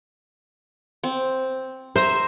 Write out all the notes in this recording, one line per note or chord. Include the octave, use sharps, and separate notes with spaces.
C4
C5 E5 A#5